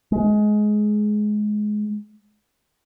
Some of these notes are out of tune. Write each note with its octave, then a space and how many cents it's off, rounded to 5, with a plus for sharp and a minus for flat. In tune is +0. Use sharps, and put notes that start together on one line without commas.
G#3 +20